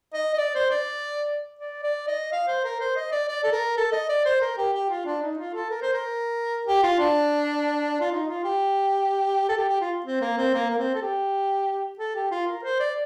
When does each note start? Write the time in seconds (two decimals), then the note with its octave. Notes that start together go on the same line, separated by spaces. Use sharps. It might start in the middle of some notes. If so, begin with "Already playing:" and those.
0.13 D#5
0.34 D#5
0.38 D5
0.55 C5
0.71 D5
1.59 D5
1.83 D5
2.07 D#5
2.32 F5
2.47 C5
2.64 A#4
2.80 C5
2.96 D#5
3.12 D5
3.29 D5
3.44 A4
3.52 A#4
3.77 A4
3.92 D#5
4.09 D5
4.25 C5
4.41 A#4
4.57 G4
4.74 G4
4.89 F4
5.05 D4
5.22 D#4
5.38 F4
5.54 A4
5.70 A#4
5.82 C5
5.94 A#4
6.67 G4
6.83 F4
6.99 D4
8.00 F4
8.12 D#4
8.28 F4
8.44 G4
9.49 A4
9.57 G4
9.69 G4
9.81 F4
10.06 C4
10.22 A#3
10.38 C4
10.54 A#3
10.70 A#3
10.78 C4
10.95 A4
11.02 G4
11.99 A4
12.15 G4
12.31 F4
12.47 A#4
12.64 C5
12.79 D5